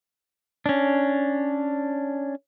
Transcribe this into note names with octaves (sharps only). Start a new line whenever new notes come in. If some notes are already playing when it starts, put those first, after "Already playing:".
C#4 D4